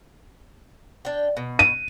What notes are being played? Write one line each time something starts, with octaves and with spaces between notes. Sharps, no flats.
D4 G5
B2
D#7